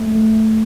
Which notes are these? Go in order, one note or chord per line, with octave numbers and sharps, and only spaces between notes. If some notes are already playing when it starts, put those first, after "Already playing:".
Already playing: A3
A3